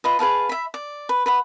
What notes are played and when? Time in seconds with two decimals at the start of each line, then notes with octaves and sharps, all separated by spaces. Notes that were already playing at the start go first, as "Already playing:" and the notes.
0.04 F4 B4 D#5
0.19 G#4 B4 F5 A5
0.49 E5 B5
0.74 D5
1.09 B4
1.26 B4 F#5 B5